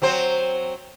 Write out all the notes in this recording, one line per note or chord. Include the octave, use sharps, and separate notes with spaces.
F#3 C4 C5